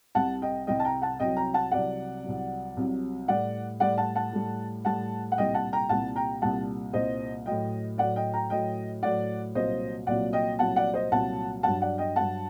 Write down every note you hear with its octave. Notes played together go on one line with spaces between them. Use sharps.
C2 C3 G3 F#5 A5
D#5 G5
C2 C3 G3 D#5 G5
A5
G5 A#5
F#5 A5
C2 C3 F#3 D#5 G5
G5 A#5
F#5 A5
C2 C3 F#3 D5 F#5
C2 C3 F#3
C2 C3 F#3
A2 G3 D5 F#5
A2 G3 D5 F#5
F#5 A5
F#5 A5
A2 G3
A2 G3 F#5 A5
F#5
C2 A#2 G3 D#5 G5
F#5 A5
G5 A#5
C2 A#2 G3 F#5 A5
G5 A#5
C2 A#2 G3 F#5 A5
C2 A#2 G3 C5 D#5
A2 F#3 D#5 G5
A2 F#3 D5 F#5
D#5 G5
G5 A#5
A2 F#3 D#5 G5
A2 F#3 D5 F#5
C2 A#2 F#3 C5 D#5
C2 A#2 F#3 D5 F#5
D#5 G5
C2 A#2 F#3 F#5 A5
D5 F#5
C5 D#5
C2 A#2 F#3 F#5 A5
G2 F#3 F#5 A5
D5 F#5
D#5 G5
G2 F#3 F#5 A5